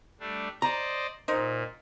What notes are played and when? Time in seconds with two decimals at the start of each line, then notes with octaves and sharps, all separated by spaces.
0.20 G3 A3 D4
0.62 C5 D5 D#5 A#5
1.28 A#2 D#4 A#4 C5